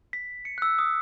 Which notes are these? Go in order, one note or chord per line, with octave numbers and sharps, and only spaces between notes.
B6
C#7
F#6
E6
D#6